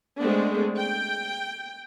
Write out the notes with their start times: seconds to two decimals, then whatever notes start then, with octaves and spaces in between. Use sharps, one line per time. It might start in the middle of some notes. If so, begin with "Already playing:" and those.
0.21 G#3 A3 B3 C4 D4
0.79 G5